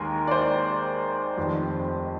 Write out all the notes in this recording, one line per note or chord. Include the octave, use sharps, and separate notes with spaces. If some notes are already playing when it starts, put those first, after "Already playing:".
Already playing: D#2 D#3 G#3 A#4
D5
C5
F1 F2 D#3